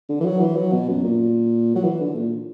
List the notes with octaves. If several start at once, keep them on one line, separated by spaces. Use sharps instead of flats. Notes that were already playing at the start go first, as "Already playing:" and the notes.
D3
E3
F#3
E3
F#3
B2
F#2
A#2
F#3
E3
D3
A#2